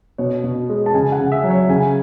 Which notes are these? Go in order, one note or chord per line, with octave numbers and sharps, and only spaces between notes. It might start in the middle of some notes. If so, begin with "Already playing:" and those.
B2 C#5
B2
G#3
A5
C#3 G#5
F#5
C#3
E5
F#3
C#5
C#3 G#5